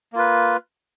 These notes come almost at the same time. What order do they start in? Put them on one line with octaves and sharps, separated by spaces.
A#3 F4 B4